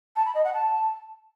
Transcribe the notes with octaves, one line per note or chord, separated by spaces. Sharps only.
A5
B5
D#5
F#5
A5